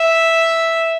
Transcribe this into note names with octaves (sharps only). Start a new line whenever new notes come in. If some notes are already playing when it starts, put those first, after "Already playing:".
Already playing: E5